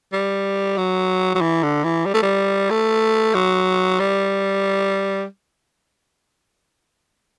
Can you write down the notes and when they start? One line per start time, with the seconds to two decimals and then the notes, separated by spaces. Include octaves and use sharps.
0.13 G3
0.77 F#3
1.35 F#3
1.41 E3
1.63 D3
1.84 E3
2.06 G3
2.14 A3
2.22 G3
2.70 A3
3.34 F#3
3.99 G3